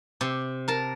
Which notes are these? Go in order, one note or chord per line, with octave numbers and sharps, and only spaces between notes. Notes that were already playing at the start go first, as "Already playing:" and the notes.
C3
A#4 A5